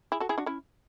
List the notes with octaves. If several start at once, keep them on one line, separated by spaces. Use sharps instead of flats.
E4 G#4
F#4 A4
E4 G#4
D4 F#4
C#4 E4